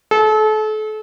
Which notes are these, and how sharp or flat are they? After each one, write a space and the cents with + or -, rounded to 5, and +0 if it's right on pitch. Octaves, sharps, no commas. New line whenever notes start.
A4 -35